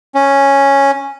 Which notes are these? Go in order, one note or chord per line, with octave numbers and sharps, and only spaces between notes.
C#4